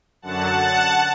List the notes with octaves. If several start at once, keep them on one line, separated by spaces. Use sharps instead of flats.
F#2 D3 F#3 F#5 A5
F#5 A5